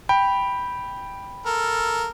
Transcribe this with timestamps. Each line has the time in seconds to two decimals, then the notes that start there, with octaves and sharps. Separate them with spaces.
0.09 G5 B5
1.46 A4 A#4